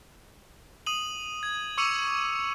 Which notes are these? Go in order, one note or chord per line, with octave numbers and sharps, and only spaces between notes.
D#6 D#7 F#7
G#6
C#6 D6 E6 C#7 D#7 F7